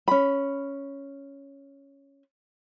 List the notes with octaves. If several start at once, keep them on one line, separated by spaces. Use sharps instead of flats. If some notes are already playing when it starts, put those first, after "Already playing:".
C#4 B5